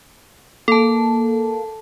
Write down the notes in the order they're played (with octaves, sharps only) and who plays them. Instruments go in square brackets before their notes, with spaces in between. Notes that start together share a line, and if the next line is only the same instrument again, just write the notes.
[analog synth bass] A#3 [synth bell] A4 A5